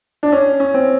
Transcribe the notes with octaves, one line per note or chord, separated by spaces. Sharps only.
D4
C#4
C#4
C4